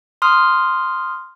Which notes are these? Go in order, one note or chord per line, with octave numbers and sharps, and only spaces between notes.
C6 D#6 F6